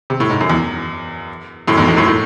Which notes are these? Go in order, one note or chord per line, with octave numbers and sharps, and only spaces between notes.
C3
A2
G#2
F#2
E2
F#2 A2
E2 G#2
E2 G#2
F#2 A2
A2